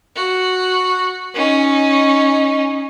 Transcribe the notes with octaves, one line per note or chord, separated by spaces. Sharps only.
F#4
C#4 D#4